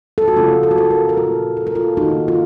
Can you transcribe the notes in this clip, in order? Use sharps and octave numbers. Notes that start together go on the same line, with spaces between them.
A4
F#4
C#3 F3 A3 C#4 F4
A4
F#4
F4 A4
F#4 A#4
A#4
A#2 A3 F4 A4
A4
A#4
F4 A4
D#3 A#3 D#4 F#4
F4